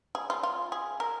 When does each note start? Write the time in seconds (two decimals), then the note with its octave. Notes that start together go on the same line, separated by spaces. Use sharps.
0.15 G#4
0.30 F4
0.43 F4
0.72 G#4
1.00 A#4